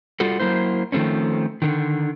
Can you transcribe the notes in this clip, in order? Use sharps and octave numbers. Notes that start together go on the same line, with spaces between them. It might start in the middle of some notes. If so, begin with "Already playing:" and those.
G3 F4 F#4 A4
F#3 A#3 E4 C5
D#3 F3 A3 C4 C#4
D3 D#3